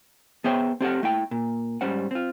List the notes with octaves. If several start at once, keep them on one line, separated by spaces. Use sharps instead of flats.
B3 G#4 C5 C#5 E5 G5
C4 G4 A4 F#5
A3 E4 G5
A#2
G#2 G3 C#4 C5 F#5
C4 F4